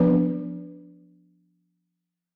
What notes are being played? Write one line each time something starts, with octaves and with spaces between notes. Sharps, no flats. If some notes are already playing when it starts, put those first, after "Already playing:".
Already playing: F3 B3 D4 B4